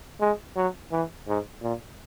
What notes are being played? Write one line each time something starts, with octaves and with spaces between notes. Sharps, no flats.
G#3
F#3
E3
G#2
A#2